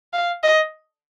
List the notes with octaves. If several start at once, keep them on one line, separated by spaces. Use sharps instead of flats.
F5
D#5